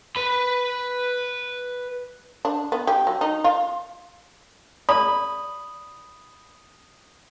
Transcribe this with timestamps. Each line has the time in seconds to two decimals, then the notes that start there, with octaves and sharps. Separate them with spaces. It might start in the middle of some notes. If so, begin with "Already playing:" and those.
0.16 B4 B5
2.45 D4
2.72 B3
2.87 G4
3.07 F#3
3.21 D#4
3.44 F4
4.89 D5 B5 D#6